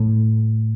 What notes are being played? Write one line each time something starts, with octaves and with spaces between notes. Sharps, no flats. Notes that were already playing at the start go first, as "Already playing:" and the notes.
Already playing: A2